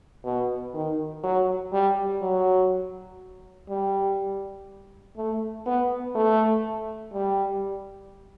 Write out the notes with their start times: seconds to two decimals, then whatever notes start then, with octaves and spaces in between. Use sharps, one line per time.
0.25 B2
0.74 D#3
1.23 F#3
1.73 G3
2.22 F#3
3.69 G3
5.17 A3
5.66 B3
6.15 A3
7.13 G3